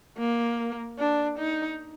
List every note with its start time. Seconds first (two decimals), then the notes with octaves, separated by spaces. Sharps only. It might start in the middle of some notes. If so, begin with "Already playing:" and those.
0.18 A#3
0.99 D4
1.38 D#4